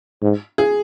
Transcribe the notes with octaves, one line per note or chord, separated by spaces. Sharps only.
G#2
G#4